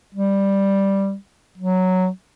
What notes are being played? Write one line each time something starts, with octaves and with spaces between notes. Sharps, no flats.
G3
F#3